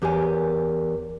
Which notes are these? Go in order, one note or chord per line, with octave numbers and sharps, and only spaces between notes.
E2 G4 A#4 C#5 G#5